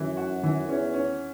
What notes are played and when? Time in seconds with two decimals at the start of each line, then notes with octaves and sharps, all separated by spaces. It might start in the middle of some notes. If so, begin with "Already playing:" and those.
Already playing: F#2 E3
0.17 F#4
0.43 E3
0.69 E2 C#4
0.94 C#4